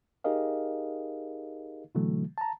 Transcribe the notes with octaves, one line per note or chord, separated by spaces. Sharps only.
D#4 G4 G#4 A#4 D#5 F5
B2 D3 E3 F#3 A3
A5 A#5